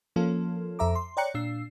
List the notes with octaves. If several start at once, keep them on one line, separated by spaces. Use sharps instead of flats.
F3 A#3 C#4 F4 A4
F2 A4 E5 A#5 D6
C6
C#5 D5 G5 A#5 F#6 C#7
A#2 D4 E6 C7